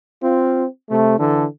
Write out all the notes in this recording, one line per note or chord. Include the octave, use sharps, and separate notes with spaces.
C4 F4
C3 A3
D3 E3 A4